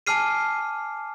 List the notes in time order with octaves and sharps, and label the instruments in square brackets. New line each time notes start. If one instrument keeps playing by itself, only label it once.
[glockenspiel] G#5 A5 D6 F6 C7 D#7